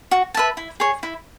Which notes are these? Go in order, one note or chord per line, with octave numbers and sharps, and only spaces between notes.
F#4
B4 E5 A5
E4
G#4 C#5
E4